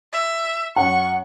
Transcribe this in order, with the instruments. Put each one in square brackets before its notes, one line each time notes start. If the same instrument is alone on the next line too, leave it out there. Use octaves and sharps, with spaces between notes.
[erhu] E5
[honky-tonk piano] F#2 F#5 [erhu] C#6